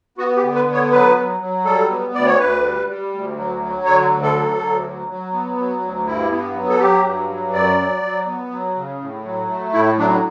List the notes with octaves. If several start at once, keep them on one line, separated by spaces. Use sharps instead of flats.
B3 F#4
G4
D3
B4
B3
C#5
F#3 B4
F#3
F#3
G3 A4
B3
D2 D5
C#5
D2 B4
G3
G3
D2
F#3
F#3
D3 C#5
D2
A4
F#3
D2
F#3
F#3
B3
F#3
D2
G2 E4
B3
F#3
A4
F#3 G4
G2
F#3
F#2 D5
F#3
F#3
B3
F#3
C#3
A2
F#3
A3
A2 E4
F#3 D4